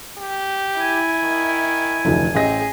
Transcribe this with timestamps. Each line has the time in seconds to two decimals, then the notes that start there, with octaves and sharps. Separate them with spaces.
0.18 G4
0.81 E4 G#5
1.22 D#3
2.05 F1 D2 E3
2.35 A1 C4 G#4 D#5 A#6